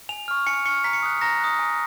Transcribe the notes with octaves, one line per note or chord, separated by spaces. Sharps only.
G#5 F7
C#6 F6
G#5 C#7
C#6 F6 C#7
A#5 B6
C#7
D#6 F#6
A#5 A#6
D#6 F#6
G#5